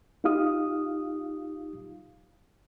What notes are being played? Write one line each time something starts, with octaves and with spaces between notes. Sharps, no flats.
D#4 F4 G4 F5 D#6